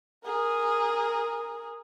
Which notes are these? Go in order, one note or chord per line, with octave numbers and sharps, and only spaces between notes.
G#4 A#4